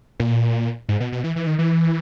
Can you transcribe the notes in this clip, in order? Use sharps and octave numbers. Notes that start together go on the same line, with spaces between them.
A#2
G#2
B2
B2
E3
E3
D#3
E3